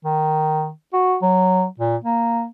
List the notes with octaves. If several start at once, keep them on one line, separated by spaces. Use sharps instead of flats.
D#3
F#4
F#3
A#2
A#3